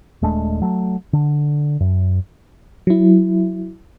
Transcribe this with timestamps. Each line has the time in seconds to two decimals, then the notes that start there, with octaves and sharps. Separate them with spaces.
0.22 D#1 G#3 A3 D4
0.62 F#3 A3
1.13 D3
1.80 F#2
2.87 F#3 E4